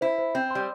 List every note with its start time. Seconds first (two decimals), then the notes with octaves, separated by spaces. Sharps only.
0.01 E4 C5
0.18 C5
0.34 C4 E5
0.51 G3 C6